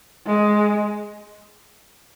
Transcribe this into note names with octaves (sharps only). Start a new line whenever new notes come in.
G#3